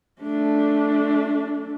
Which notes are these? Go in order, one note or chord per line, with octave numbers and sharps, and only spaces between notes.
A3 D4